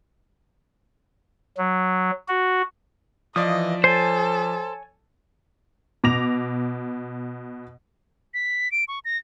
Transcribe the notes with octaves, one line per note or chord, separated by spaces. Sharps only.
F#3
F#4
E3 F3 D5 D#5 F5 D#6
A4 C5 C#5 G#5 A5
B2 D6 A#6 F7
B6
D7
C#6
A#6